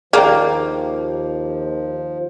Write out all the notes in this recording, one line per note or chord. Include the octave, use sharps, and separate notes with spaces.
D#2 F3 A#3 G#4 D5 G5